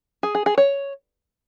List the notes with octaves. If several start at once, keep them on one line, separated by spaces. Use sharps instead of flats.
G#4
G#4
G#4
C#5